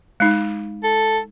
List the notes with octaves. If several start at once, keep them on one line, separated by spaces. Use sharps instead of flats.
G#3 D#4
A4